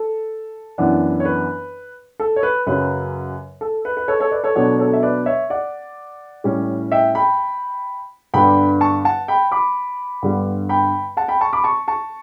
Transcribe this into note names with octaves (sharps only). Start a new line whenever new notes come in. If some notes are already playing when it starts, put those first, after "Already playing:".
Already playing: A4
F#2 E3 B3 D4
C#5
B4
A4
C#5
B4
F#2 C#3 F#3 C#4 B4
A4
B4
B4
A4 C#5
A4 C#5
B4 D5
A4 C#5
B2 F#3 B3 D4 A4 C#5
A4 C#5
E5
B4 D5
C#5 E5
D5 F#5
A2 G3 C#4
E5 G5
G5 B5
G2 D3 G3 B3 D4 G5 B5
A5 C#6
F#5 A5
G5 B5
B5 D6
G2 D3 G3 B3
G5 B5
F#5 A5
G5 B5
A5 C#6
B5 D6
A5 C#6
A5 C#6